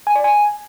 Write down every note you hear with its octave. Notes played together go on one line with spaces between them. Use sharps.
G#5
D5
G#5